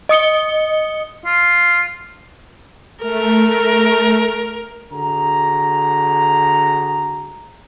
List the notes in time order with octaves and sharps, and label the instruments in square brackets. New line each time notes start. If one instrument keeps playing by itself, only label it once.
[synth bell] D#5 D#6 C#7 G7
[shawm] F4
[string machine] A3 [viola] A#4
[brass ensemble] D3 F#4 G#4 A#5